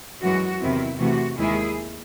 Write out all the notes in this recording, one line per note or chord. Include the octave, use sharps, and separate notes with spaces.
F#2 E3 G#3 F#4
E2 C3 D#3 F#3 C4 E4
C3 E3 A3 F#4
D#2 D#3 G#3 E4 G#4